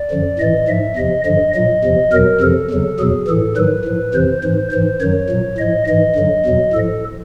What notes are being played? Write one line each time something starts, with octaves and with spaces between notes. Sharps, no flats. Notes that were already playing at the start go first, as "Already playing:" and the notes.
Already playing: D5
F#2 D3 F3
A2 E3 D#5
G#2 F3 E5
E2 C3 F3 D#5
G2 D3 F3 D#5
A#2 F#3 D#5
E2 C3 F3
E2 B2 F#3 A#4
F2 C3 F3 A4
E2 C#3 F#3
E2 B2 F#3 G#4
A2 E3 A4
G#2 D#3 F#3 B4
A2 F3
F2 C3 E3 C5
G#2 E3 C5
G#2 E3 C5
F#2 D#3 F#3 C#5
A#2 F#3
A2 F3 D#5
G#2 E3 D#5
G2 D3 F#3
E2 B2 F#3
A2 F3 A4